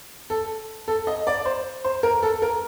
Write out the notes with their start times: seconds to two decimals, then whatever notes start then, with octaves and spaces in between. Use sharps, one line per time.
0.30 A4
0.88 A4
1.07 D#5
1.27 D5
1.45 C5
1.84 C5
2.03 A#4
2.23 A4
2.42 A#4